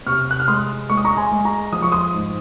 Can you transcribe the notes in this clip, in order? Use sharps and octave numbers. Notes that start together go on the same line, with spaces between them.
C3 C#6 F6
F#6
F6
G#3 C6 D#6
G#3 C#6
D#6
A#5 C#6
G#5 C6
G#3
A#5 C#6
F3 D#6
C#6
C6 D#6
G#2